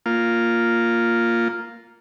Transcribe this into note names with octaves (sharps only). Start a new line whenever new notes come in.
A#3 F4